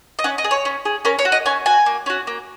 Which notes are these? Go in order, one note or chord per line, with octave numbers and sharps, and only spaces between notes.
D#5
C#4 F#5
D#5
G#4
C#5
C#4
G#4
C#4 A#4
C#5
F#4
D#5
C#4 G#5
F#4 G#5
A#3
C#4 F#4
A#3